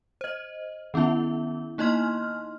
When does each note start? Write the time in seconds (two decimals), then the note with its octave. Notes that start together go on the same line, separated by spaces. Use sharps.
0.21 C5 D#5
0.94 D#3 B3 C#4 E4 E5
1.78 A#3 D#4 E4 D#5 C6 F6